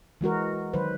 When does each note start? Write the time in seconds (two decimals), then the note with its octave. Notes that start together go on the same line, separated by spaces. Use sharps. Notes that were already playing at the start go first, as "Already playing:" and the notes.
0.21 E3 G#3 F#4 A#4
0.73 D#3 F#3 B4 C5